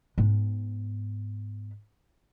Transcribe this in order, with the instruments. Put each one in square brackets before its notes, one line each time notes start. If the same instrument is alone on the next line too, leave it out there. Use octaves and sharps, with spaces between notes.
[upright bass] G#2 B3